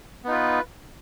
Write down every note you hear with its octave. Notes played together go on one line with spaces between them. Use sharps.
B3 D#4 F4 B4